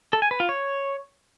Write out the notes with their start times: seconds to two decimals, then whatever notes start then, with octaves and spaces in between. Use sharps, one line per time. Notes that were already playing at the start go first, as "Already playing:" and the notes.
0.13 A4
0.22 G#5
0.31 B4
0.40 F4
0.49 C#5